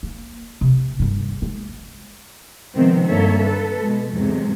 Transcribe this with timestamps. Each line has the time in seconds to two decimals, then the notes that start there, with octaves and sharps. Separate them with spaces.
0.03 A#3
0.61 C3
0.99 G2 D#3
1.42 G#3
2.75 C3 D#3 F3 G#3 B3 C4
3.07 G2 D3 A#3 A4 C#5 E5
3.40 A4 B4
3.81 B2 G#3
4.13 E2 G#2 C3 F#3 G#3 A3